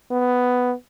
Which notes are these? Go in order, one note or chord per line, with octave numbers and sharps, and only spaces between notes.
B3